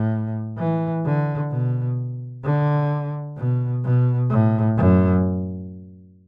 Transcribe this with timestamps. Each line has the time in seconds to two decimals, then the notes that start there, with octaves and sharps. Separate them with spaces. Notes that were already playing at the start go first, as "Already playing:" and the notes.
Already playing: A2
0.58 E3
1.05 D3
1.51 B2
2.44 D3
3.37 B2
3.84 B2
4.29 A2
4.77 F#2